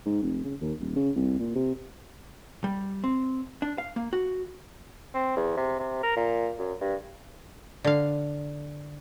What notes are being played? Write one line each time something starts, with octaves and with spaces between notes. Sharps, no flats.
G#2
F1
C#3
D#2
D#1
C#3
C2
A#2
C3
G3
C4
D4
F5
A#3
F#4
C4
E2
C3
C3
A#4
A#2
F#2
G2
D3 F5